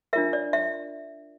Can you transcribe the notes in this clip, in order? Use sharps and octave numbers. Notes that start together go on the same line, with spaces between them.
D4 F4 A#4 E5
D5
E5